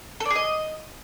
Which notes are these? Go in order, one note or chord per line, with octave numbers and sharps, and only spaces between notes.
A4
D5
G#4
D#5